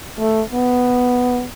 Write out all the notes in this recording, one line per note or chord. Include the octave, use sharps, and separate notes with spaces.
A3
B3